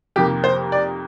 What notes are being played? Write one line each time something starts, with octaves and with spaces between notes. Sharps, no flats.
F2 C3 D#3 A#3 G4
C5
D5